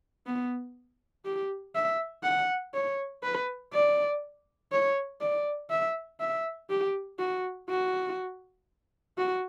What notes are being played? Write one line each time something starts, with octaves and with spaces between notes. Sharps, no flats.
B3
G4
E5
F#5
C#5
B4
D5
C#5
D5
E5
E5
G4
F#4
F#4
F#4